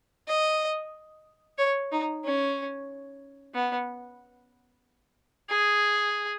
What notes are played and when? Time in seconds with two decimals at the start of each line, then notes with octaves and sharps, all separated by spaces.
0.28 D#5
1.58 C#5
1.92 D#4
2.25 C#4
3.54 B3
5.50 G#4